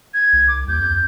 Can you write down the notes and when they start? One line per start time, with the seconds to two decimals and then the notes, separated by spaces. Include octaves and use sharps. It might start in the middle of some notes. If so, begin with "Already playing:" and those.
0.14 G#6
0.33 C2
0.48 D6
0.68 D#2 G6
0.80 F2